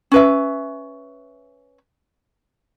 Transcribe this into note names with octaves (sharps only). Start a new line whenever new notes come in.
C#4 B4 E5